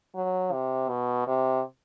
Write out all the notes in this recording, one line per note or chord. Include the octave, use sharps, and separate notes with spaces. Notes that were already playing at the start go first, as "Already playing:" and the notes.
F#3
C3
B2
C3